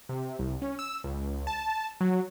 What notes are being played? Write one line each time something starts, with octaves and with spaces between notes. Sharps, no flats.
C3
C2
C#4
E6
C#2
A5
F#3